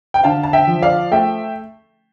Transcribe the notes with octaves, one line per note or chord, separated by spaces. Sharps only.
G5
D3 F5 A5
A5
E5 G5
F3
D5 F5
A3 E5 G5